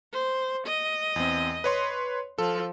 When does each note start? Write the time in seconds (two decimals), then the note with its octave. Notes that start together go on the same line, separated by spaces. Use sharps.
0.13 C5
0.67 D#5
1.16 E2 C4
1.64 B4 C#5 C6
2.38 F3 A4